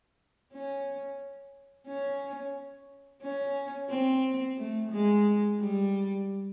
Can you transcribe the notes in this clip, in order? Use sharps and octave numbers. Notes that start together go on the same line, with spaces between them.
C#4
C#4
C#4
C4
A3
G#3
G3